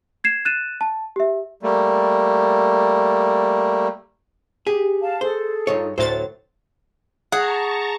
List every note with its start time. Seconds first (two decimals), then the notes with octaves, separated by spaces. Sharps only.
0.24 G#6 C7 E7
0.45 F#6 A6 D#7 E7
0.81 A5
1.16 G4 E5
1.63 G3 A3 A#3
4.67 G4 G#4
5.02 F5 A5
5.21 G#4 A4 C5
5.67 G2 D#4 F4 C#5
5.98 D2 A2 F#3 C5 A6
7.32 G#4 F#5 A5 A#5 C#6